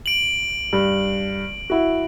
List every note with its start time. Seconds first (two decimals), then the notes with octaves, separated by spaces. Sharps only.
0.06 D7 F#7
0.73 G2
1.70 E4 F#4